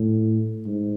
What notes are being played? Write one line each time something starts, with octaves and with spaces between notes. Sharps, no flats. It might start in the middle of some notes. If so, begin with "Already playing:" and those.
Already playing: A2
G#2